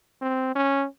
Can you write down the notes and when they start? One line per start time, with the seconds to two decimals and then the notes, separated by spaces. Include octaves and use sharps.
0.22 C4
0.56 C#4